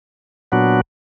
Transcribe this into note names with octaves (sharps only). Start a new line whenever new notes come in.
A#2 F#3 B3 D4 F#4